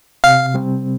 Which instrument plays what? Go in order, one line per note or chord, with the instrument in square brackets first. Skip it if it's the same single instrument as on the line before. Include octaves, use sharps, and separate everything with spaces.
[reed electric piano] C3 [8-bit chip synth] F5
[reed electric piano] G3 C4